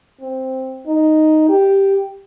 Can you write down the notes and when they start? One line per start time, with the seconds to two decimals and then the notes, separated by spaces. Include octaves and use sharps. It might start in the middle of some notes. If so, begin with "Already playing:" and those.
0.21 C4
0.87 D#4
1.49 G4